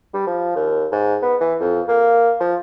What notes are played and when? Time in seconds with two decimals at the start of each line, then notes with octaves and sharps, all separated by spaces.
0.14 G3
0.27 F3
0.56 D#2
0.92 G#2
1.22 B3
1.41 E3
1.60 F2
1.88 A#3
2.40 F3